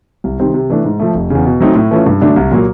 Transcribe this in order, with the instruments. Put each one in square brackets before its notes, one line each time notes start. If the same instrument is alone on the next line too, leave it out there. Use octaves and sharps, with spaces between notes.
[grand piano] C2
C3 D#3 G3 C4
C3
E3 A3 D4
G#2
F3 A3
F1
E2 C#3
B2
F#3 A3 C4 D#4
A2
E3 A3 C#4 F4
G2
D3 F#3 A3 D4
C2
A#2 F#3 A#3